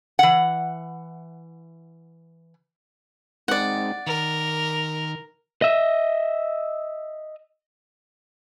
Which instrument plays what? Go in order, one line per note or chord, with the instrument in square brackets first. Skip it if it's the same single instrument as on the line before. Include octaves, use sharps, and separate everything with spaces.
[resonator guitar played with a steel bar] E3 F#5
[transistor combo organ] G#3 C4 D#4 [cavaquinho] D5 F#5
[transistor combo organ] D#3 [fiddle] A#4
[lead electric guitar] D#5 E5